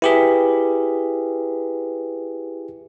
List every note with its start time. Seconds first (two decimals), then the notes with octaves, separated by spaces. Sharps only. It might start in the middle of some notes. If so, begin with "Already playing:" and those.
0.02 E4 G4 G#4 B4 B6